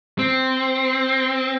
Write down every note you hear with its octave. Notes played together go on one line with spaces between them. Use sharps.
C4